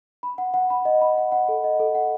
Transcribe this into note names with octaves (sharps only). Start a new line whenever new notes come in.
B5
F#5
F#5
B5
D#5
B5
F#5
F#5
A4
D#5
A4
F#5